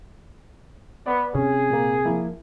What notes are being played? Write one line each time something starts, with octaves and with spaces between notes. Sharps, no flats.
B3 B4 D5
C3 C#4 G#4
A#2 A#3
F3 A#3 E4